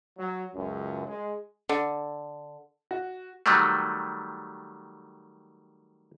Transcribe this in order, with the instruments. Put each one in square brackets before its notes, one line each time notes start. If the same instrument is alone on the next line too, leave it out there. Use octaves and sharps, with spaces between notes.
[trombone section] F#3
C#2 F#2
G#3
[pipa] D3
[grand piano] F#4
[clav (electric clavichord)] D#3 F#3 G3 A3